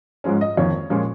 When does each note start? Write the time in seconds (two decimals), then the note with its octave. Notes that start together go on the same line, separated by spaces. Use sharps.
0.24 G#2 F3 G#3 C#4
0.41 D#5
0.57 F2 D#3 A#3 C#5
0.90 A#2 F3 G#3 C#4